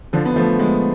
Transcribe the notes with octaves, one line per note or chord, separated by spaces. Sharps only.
D3 F3
B3
F3 A3
G#3 B3